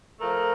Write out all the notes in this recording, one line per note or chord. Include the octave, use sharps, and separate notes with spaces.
F3 A3 A#4